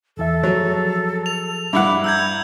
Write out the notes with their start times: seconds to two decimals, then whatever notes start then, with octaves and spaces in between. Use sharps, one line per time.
0.17 E2 E3 A4 E5
0.43 F#2 F3 F#3 G#4
1.26 F7
1.73 G2 E4 E5 F#5 D6
2.04 A#5 E6 G6 G#6